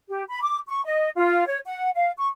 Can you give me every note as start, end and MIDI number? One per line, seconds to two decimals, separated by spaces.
0.09 0.23 67
0.29 0.42 83
0.42 0.59 86
0.69 0.82 85
0.85 1.10 75
1.15 1.46 65
1.46 1.58 73
1.65 1.90 78
1.94 2.11 77
2.16 2.27 85